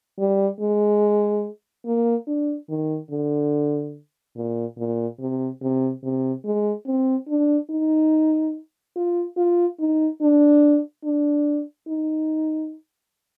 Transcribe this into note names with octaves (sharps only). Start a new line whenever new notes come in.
G3
G#3
A#3
D4
D#3
D3
A#2
A#2
C3
C3
C3
G#3
C4
D4
D#4
F4
F4
D#4
D4
D4
D#4